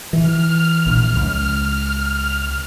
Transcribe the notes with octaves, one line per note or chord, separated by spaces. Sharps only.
E3 F6
A#1
C#2